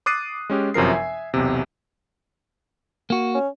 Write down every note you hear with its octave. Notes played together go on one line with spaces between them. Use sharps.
D6 D#6 F#6 A6 C7 D#7
G#3 C#4 G4
G1 F#2 C3 F3 A#4 C7
E5 G#5
B1 E2 C3
A#3 F#4
C#4